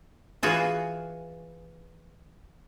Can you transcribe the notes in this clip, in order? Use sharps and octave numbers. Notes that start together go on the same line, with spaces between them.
E3 F4 F#4 G#4